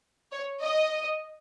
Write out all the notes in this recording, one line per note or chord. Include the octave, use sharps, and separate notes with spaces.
C#5
D#5